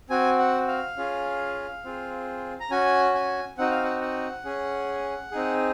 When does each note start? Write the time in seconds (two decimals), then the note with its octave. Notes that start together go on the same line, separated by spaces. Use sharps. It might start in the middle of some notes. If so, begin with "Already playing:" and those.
0.10 C4 F#4 G#5
0.39 F#5
0.68 F5
0.97 C#4 F4 G#4
1.84 C4 F4 G#4
2.60 A#5
2.70 C#4 F#4 G#5
3.15 G#5
3.58 C4 D#4 F#4 F#5
3.71 F5
3.83 F#5
4.01 F#5
4.45 C#4 G#4
5.31 C4 D#4 G#4